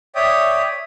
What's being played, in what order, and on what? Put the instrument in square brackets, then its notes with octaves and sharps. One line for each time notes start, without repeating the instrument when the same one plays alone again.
[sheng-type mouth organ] C#5 D5 E5 G5 D#6